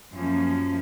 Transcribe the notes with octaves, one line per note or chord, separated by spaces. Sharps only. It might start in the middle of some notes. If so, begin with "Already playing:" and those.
F#2 F3 A#3 C#4